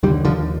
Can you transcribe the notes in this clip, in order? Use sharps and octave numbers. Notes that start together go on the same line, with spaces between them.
D#2 D3 D#3 G3
D3 F3